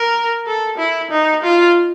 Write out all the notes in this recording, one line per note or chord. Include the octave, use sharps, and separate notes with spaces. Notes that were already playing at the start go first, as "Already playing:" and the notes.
Already playing: A#4
A4
E4
D#4
F4